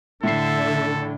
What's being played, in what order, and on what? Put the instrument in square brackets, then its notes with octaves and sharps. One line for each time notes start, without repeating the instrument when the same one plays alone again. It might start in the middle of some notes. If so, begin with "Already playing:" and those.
[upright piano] A2 C7 [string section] D3 [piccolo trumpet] A4 [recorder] E5